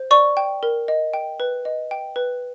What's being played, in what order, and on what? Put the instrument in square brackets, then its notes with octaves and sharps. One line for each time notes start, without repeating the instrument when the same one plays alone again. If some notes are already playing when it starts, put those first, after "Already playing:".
Already playing: [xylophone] C5
D5 C#6
G5
A#4
D#5
G5
B4
D#5
G5
B4